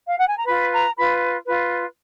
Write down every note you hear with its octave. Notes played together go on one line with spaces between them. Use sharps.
F5
F#5
G#5
A#5
F4 B4 B5
A#5
F4 B4 B5
F4 B4